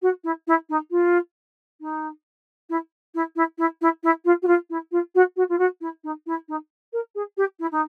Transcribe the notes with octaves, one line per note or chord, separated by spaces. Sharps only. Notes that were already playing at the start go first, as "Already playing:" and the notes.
F#4
E4
E4
D#4
F4
D#4
E4
E4
E4
E4
E4
E4
F4
F#4
F4
E4
F4
F#4
F#4
F4
F#4
E4
D#4
E4
D#4
A#4
G#4
G4
E4
D#4